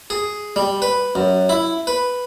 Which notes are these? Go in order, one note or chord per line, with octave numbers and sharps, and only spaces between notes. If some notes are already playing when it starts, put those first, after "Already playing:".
G#4
G3
B4
F#2
E4
B4